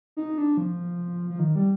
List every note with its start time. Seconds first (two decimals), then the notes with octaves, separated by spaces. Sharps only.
0.17 D#4
0.38 D4
0.57 F3
1.30 F3
1.39 D#3
1.56 G3